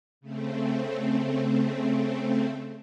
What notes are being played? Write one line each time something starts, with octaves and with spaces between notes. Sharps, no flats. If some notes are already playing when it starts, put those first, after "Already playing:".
C#3 A3 C4